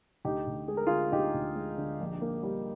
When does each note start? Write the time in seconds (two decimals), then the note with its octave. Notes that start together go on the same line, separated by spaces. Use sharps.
0.25 D2 D#4 G4
0.47 D2
0.68 G#3 G#4
0.77 A#4
0.87 D3 F4 G#4
1.12 D2 D#4 G4
1.34 D2
1.56 G#3
1.78 D3
2.01 A#1
2.22 A#3
2.43 G3